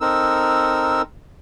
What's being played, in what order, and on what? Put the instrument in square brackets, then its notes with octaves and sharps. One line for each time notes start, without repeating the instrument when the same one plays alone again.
[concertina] C4 D#4 A4 A#4 E6